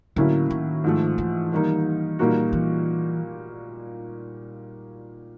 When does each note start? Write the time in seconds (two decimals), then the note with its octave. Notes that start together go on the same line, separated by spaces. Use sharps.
0.16 A2 D3 F#3 A#3 C#4 E4
0.50 D#3
0.84 G#2 F3 A3
1.18 E3
1.52 D#3 G3 A#3 D#4
2.19 A#2 G3 A#3 D#4 F#4
2.53 E3